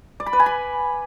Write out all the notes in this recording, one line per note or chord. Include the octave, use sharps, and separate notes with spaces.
D5
B5
B4
G#5
B5